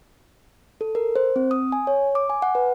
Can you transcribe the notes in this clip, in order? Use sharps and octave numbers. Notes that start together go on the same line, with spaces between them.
A4
A#4
C5
C4
D#6
G#5
C#5
D6
G#5
F#5
B4